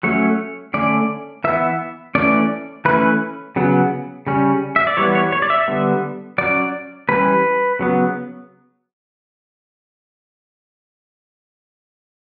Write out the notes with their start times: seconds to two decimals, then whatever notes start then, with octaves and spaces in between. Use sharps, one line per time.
0.03 F#3 A3 C#4 C#5
0.74 D3 A3 C#4 D5
1.44 E3 B3 E5
2.15 E3 A3 C#4 D5
2.85 E3 A3 C#4 B4
3.56 C#3 F#3 B3
4.27 C#3 G3 C#4
4.76 E5
4.87 D5
4.97 E3 G3 B3 C#5
5.15 C#5
5.32 C#5
5.42 D5
5.50 E5
5.68 D3 G3 B3
6.38 F#3 C#4 D5
7.09 E3 G3 C#4 B4
7.79 C#3 F#3 B3